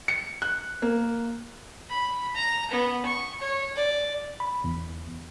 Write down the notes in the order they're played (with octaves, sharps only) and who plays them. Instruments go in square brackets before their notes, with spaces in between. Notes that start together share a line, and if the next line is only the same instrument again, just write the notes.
[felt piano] C#7
F#6
A#3
[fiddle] B5
A#5
B3
C#6
C#5
D5
[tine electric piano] B5
E2